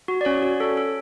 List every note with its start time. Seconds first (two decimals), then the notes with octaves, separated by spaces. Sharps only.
0.08 F#4
0.21 D5
0.25 C#4 C#5
0.42 F#4
0.60 A4
0.77 A4